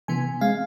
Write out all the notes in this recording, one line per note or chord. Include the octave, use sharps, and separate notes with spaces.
C3 E3 B3 G#5
G#3 C4 F5